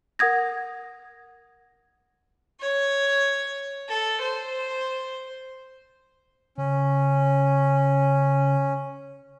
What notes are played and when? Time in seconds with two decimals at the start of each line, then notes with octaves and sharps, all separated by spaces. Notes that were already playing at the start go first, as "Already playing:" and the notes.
0.19 A#4 F#5 D#6 G#6 A#6
2.60 C#5
3.90 A4
4.20 C5
6.58 C#3 C#4